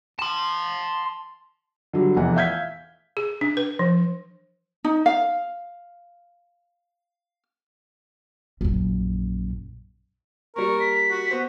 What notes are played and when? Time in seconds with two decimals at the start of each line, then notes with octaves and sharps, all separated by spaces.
0.19 A5 C6
1.93 D3 F#3 G3
2.16 F1 E2 E3 F#5
2.36 E5 F5 G6 G#6 B6
3.17 G#4
3.41 D4
3.57 B4
3.79 F3
4.85 D#4
5.06 F5
8.61 A#1 F#2
10.56 G3 A#3 A#4 C#6
10.80 B6
11.10 F#4
11.31 B3 C5